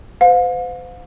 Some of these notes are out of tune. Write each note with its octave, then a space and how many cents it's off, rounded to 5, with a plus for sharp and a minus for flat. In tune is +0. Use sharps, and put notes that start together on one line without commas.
C5 -40 F5 +40